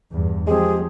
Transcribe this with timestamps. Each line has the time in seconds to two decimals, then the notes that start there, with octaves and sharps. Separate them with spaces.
0.11 E2 G2
0.47 F3 G#3 C4 G4 G#4